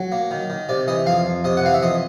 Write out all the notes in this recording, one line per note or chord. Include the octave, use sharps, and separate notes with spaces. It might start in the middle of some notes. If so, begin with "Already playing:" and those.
Already playing: F#3
A#3
D#3
D#3
C3 D5
E3 D#5
F2 F5
F2
C3 D#5
F#5
E3 F5
E5
F2 D#5